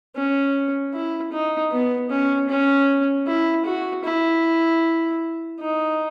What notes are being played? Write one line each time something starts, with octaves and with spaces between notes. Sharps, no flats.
C#4
E4
D#4
B3
C#4
C#4
E4
F#4
E4
D#4